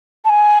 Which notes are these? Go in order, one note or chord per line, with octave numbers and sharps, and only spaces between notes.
A5
G#5